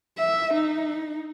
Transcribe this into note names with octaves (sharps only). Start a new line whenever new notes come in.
E5
D#4